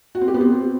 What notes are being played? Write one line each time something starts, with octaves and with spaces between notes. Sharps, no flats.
F#4
C4
G4
B3
C4